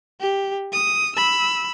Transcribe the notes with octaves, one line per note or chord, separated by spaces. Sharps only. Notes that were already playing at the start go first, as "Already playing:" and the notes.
G4
D#6
B5 E6